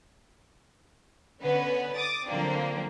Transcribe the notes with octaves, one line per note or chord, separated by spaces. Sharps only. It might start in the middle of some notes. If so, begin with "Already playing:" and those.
D3 B3 C#4 B4
D6 D#6 A6
D3 F3 F#3 A#3 C4 D4